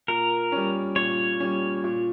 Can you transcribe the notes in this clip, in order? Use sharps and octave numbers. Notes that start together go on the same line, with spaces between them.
A#2 A#4
G3 C#4
A#2 C#5
G3 C#4
A#2